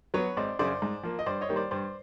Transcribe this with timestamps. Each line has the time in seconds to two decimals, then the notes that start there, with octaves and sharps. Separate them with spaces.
0.14 F#3 B3 B4 C#5
0.37 G#1 C5 D5
0.59 F#2 C#3 C5 D5
0.82 G#2
1.03 F3 A#3
1.19 D#5
1.26 G2 C5 D5
1.41 C#5 D#5
1.49 D#3 G3 A#3
1.56 C5 D5
1.71 G2 C5 D5